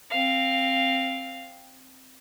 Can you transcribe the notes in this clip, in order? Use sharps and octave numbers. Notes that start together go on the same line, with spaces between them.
C4 F5